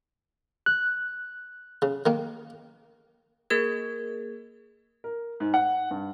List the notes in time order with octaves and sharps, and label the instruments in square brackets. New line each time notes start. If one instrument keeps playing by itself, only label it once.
[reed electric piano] F#6
[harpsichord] C#3
D#3 A#3
[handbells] A#3 G#4 A#4 G#6
[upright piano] A#4
G#2
F#5
G2